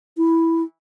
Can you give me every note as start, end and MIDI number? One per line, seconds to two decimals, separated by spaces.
0.17 0.63 64